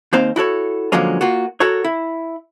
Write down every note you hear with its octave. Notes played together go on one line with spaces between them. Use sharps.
D#2 A#3 C4 D#4 C5 F5
E4 F#4 A4 C#5
D3 F3 F#3 G#3 A#3 C#4
A#3 F4 F#4
F#4 A4 A#4 C#5
E4